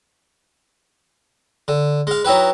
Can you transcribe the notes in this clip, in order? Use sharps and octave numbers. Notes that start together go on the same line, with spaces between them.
D3
G#3 F5
F#3 D#4 E4 G4 B4